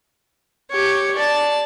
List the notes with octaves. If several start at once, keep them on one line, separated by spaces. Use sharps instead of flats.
G4 C#5
D5 A5